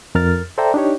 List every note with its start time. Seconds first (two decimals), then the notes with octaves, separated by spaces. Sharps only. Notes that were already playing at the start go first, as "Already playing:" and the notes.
0.15 F2 A#4 F6 A6
0.58 A4 C5 D5 E5 G5 A#5
0.74 D4 D#4 G4 C#5